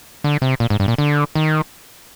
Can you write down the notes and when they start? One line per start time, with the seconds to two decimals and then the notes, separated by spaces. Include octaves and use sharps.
0.24 D3
0.42 C3
0.60 A#2
0.70 G#2
0.80 G2
0.88 A#2
0.98 D3
1.35 D#3